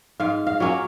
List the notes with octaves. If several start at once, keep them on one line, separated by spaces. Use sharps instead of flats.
G#2 F5
F5
F#3 A#3 C#4